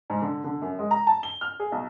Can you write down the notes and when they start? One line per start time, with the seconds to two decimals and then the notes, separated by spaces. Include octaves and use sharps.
0.10 G#2
0.22 D3
0.44 D3
0.62 F#2
0.79 G#3
0.91 A#5
1.07 A5
1.23 G7
1.41 F6
1.60 G#4
1.72 B1